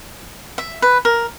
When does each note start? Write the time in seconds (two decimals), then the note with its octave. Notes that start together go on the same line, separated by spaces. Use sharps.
0.58 E5
0.82 B4
1.05 A#4